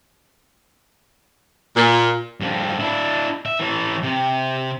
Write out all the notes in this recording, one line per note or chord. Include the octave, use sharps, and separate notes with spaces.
A#2
G2 F3
D4 E4
E5
E3 C#5
C3